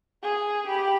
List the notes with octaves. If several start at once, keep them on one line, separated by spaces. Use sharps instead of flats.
G#4
G4 B5